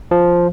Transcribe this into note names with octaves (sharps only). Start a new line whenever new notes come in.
F3